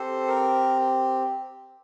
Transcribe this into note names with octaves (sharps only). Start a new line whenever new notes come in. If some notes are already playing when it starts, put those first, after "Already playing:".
Already playing: C4 G4 A4 C5
A#4